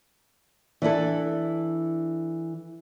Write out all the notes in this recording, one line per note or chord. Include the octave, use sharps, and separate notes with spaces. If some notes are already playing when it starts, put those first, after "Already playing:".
E3 D4 E4 A4